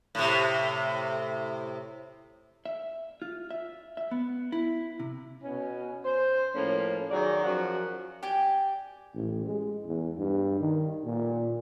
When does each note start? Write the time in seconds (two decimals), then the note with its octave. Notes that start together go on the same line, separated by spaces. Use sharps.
0.15 A2 C3
2.66 E5
3.22 F4
3.51 E5
3.97 E5
4.11 B3
4.52 E4
4.99 C3
5.43 B2 C#4
6.05 C5
6.55 A2 F3 A#3 C#4
7.11 D#3 F#3 G#4 D5
7.44 F#2 F3 F#5
8.23 G4 D5 G5 G#5
9.14 A1
9.46 G#3
9.85 E2
10.17 G2
10.60 D#3
11.05 A#2